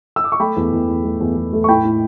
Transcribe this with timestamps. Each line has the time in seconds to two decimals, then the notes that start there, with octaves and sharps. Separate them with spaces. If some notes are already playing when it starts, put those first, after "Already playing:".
0.16 E6
0.24 D6
0.32 C#6
0.40 A3 G5 B5
0.56 E2
0.72 E2
0.88 E2
1.04 A3
1.20 E2
1.36 E2
1.53 A3
1.64 C#6
1.68 A2 G5 B5
1.85 A2